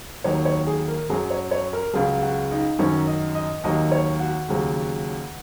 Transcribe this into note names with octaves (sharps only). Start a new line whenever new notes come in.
D#2 D#3 F#3 C#5
C#5
G#4
A#4
F#2 F#3 G#4
C#5
C#5
A#4
C#2 C#3 F#3 G#4
F#4
D#4
F#2 D#3 F#3 C#4
D#5
D#5
D#2 D#3 F#3 D#5
C#5
F#4
D#2 C#3 F#3